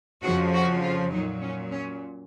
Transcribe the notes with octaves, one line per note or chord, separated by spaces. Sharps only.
F2 C#3 F3 F#4
F#4
F4
A#2 F#3 D#4
C#4
C#4